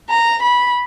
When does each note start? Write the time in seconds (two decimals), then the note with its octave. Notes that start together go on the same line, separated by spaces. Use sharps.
0.10 A#5
0.42 B5